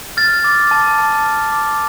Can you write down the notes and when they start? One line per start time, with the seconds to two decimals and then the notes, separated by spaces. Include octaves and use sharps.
0.17 F6 A6
0.44 D6
0.71 A5
0.99 A5
1.25 F6
1.52 D6